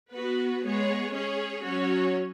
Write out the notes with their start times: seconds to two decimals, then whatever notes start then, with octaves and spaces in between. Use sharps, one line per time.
0.13 B3 F#4 B4
0.63 G#3 B3 G#4 C#5
1.13 C#4 G#4 C#5
1.63 F#3 C#4 F#4 C#5